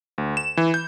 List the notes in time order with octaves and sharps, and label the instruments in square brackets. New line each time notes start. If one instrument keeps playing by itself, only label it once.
[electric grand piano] D2
E7
E3
G6